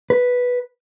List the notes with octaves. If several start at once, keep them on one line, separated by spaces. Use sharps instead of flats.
B4